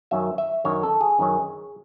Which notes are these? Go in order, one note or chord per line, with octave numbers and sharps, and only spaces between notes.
F#2 D#3 F#3 C#4 E5
E5
F#2 D#3 F#3 C#4 C#5
A4
G#4
F#2 D#3 F#3 C#4